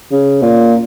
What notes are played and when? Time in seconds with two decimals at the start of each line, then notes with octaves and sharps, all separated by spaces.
0.12 C#3
0.42 A#2